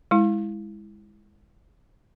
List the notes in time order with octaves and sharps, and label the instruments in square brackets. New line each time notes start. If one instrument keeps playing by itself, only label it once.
[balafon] G#3 E4